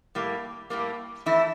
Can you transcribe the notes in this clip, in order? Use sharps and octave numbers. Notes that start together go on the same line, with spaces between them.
A2 G3 A#3
A2 G3 A#3
F2 E3 A3 E4